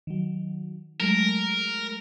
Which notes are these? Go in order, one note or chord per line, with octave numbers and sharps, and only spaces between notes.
D#3 F#3
F#3 G#3 A3 A#4